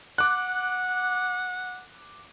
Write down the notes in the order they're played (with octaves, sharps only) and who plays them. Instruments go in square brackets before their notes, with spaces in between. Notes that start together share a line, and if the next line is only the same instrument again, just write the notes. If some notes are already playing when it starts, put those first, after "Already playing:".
[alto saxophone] F#5 [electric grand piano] D6 F#6